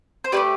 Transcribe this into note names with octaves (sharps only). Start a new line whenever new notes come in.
C5
A3 C4 G4 B4 D5